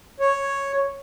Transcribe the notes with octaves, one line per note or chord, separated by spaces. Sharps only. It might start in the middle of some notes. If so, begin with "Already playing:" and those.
C#5